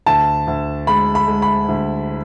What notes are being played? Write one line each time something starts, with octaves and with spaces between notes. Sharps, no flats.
D2 A5
D2
G#3 B5
B5
G#3
B5
D2